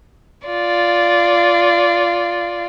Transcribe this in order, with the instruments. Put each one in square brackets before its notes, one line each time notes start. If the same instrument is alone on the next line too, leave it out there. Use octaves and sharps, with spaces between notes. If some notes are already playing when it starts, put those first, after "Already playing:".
[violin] F4 D5